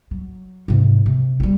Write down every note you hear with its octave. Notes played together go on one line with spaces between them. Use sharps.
F#3
G#2 C3
C3
F#3 G3